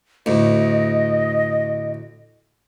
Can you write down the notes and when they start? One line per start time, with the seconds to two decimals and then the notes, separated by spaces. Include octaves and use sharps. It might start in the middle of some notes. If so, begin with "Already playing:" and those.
0.26 D2 A2 D#5